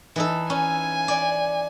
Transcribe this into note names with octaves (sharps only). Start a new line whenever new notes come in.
E3 D#4 A4
C#4 G#5
D5